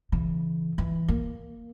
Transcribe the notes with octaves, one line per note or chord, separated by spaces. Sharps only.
C#3 E3
E3
A#3